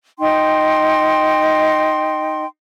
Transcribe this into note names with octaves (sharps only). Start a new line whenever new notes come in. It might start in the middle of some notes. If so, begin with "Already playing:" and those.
D#4 G5 C6